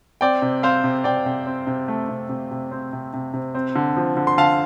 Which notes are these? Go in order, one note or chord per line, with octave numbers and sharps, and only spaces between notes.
C4 D5 G5
C3
C4 C5 F5
C3
C3 D5 G5
C3
C4
C3
A3
C3
C3
C3
C4
C3
C3
C3
C4
D3
F3
D3
C6
D3 F5 A5